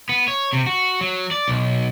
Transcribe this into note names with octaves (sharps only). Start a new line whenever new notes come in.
B3
C#5
C3
F#4
F#3
D5
B1